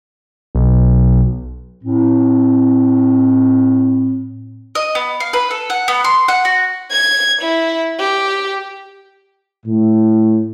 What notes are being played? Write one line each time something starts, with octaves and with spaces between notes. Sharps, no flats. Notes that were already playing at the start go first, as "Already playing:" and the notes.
B1
A2 C4
D#5
B3
F5
B4
A4
F#5
B3
C6
F#5
F#4
G#6
E4
G4
A2